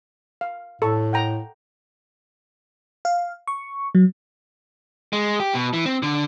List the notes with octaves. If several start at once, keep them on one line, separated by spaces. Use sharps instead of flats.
F5
A2 A4 C#6
F#5 G5 A#5
F5
C#6
F#3
G#3
G4
B2
E3
C4
D3